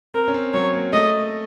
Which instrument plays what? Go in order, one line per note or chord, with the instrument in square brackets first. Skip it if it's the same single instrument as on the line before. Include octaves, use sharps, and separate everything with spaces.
[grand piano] C4 [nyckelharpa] A#4
[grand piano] C#4
C4
[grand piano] F#3 [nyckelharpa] C#5
[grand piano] A#3
[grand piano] A3 [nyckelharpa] D#5